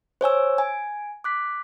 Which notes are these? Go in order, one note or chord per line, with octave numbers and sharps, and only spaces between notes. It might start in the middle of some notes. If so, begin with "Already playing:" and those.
C5 C#5 G#5 E6
G#5
D6 F#6 B6